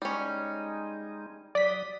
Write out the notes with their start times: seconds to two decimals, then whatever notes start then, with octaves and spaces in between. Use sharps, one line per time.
0.02 G3 G#3 C#4 D#4
1.55 F#3 D5 D#6 B6